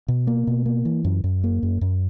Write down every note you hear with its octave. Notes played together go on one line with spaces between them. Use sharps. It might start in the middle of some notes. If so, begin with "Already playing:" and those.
B2
A#3
B2
A#3
E3
F#2
F#2
A#3
F#2
F#2